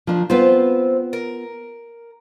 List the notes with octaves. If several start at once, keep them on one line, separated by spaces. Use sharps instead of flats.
D#3 F3 D4
B3 C4 F4 B4 C5
A#4